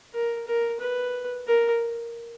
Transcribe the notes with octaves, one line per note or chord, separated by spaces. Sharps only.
A#4
A#4
B4
A#4